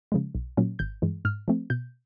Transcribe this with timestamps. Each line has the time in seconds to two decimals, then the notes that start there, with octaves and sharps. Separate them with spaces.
0.12 C#3 F3 G#3
0.35 B1
0.57 A#2 F#3 A#3 C#4
0.79 G#1 G6
1.02 G2 E3 G#3
1.25 G#2 F6
1.48 F3 A3 C4
1.70 B2 G6